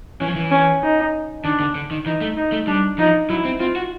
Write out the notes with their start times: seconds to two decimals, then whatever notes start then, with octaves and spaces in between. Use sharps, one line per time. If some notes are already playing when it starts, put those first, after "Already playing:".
0.20 E3 C#4
0.28 F3
0.35 E3
0.51 C#4
0.83 D#4
1.44 D#3 D4
1.60 D3
1.75 D3
1.91 D#3
2.06 E3 D#4
2.21 A3
2.37 D#4
2.52 A3
2.67 G3 D4
2.98 F3 D#4
3.30 F#3 E4
3.45 C4
3.60 C4 F4
3.76 F#4